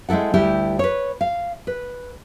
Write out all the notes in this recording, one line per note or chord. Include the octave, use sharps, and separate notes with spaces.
G#3 C4 E4 A4 F#5
D2 G3 E4 G4
B4 C#5
F5
B4